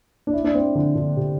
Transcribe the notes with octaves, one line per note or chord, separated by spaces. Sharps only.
D4
E4
D4
C4
D3
D3
C3